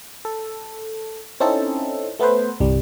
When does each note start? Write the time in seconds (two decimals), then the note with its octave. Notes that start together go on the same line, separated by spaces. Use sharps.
0.25 A4
1.40 C4 C#4 D#4 E4 A4
2.19 A3 B3 A4 B4 C5
2.60 G1 C2 G3